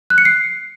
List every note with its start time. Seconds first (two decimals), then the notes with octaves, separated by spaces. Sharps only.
0.10 F#6
0.18 C#7
0.25 C7